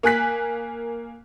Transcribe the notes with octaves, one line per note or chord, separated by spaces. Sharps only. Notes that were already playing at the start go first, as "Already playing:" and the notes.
A#3 G#5 F#6 B6